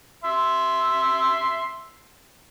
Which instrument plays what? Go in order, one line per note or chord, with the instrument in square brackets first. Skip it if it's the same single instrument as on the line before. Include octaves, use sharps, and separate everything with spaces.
[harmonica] E5 C6